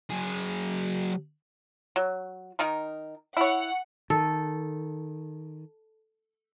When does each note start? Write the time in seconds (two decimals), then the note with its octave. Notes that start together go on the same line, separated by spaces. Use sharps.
0.10 F#3 G#4
1.96 F#3
2.59 D#3 D#4 A#4
3.37 E4 C#5 F#5
4.10 D#3 A4